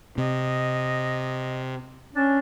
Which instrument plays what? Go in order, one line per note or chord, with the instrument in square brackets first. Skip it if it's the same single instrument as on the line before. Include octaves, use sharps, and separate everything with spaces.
[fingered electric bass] C3 [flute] D#5
[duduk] C#4 [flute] D4